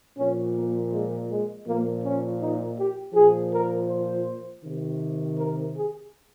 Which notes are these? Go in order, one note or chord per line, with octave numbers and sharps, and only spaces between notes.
A#2 F3 C#4
A#3
G#3
G#3
A#2 F3 A#3
C#4
D#4
G4
A#2 F3 G#4
A#4
C5
C3 D#3
A#4
G#4